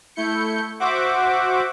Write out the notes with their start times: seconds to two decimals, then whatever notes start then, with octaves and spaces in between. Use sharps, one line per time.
0.16 A3 E4 G6 C#7
0.80 F#4 C5 E5 F#5 D6